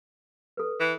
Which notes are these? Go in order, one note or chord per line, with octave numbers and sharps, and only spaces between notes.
A4 B4
E3